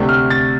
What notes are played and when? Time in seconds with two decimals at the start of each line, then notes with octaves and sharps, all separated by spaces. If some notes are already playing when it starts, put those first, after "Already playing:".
Already playing: D2 C3 A3 D4
0.09 F6
0.30 A6